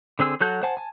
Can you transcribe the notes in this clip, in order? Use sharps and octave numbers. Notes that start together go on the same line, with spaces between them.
D3 C4 G#4 E6
F#3 F#4 A4 A5 G6
C5 F#5 G#5 A5
G#5 A5